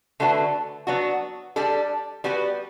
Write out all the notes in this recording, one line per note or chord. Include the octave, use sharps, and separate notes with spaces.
D3 A3 D4 F#4 B4
F#3 B3 D4 F#4
G3 D4 A4
G3 B3 F#4 B4